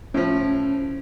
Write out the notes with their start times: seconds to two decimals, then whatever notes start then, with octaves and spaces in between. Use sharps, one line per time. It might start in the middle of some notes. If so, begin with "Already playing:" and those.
0.14 A2 F3 C#4